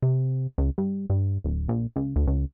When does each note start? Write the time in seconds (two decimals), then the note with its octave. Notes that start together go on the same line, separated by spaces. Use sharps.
0.02 C3
0.58 C#2
0.78 G2
1.10 G2
1.44 D1
1.68 A#1
1.96 C#2
2.16 D2
2.27 C#2